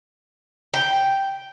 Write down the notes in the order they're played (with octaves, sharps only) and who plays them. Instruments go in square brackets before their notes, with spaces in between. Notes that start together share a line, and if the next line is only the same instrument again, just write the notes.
[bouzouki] G5